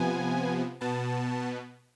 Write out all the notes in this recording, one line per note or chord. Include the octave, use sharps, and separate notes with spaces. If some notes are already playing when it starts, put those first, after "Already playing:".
Already playing: C3 F3 B3 G#5
B2 B3 A5